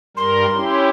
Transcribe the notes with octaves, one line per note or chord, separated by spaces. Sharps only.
G2 G3 A#4 C6
C#4 E4 G4